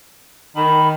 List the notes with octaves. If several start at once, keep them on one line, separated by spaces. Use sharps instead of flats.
D#3 B5